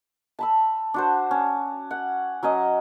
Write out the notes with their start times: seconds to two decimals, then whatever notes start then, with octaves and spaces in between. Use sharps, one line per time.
0.39 A5 B5 E6
0.94 D4 F#4 C5
1.31 C#4
1.91 F#5
2.43 F#3 C#4 D#5